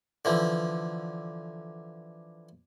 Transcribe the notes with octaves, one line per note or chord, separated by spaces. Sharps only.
D3 E3 F3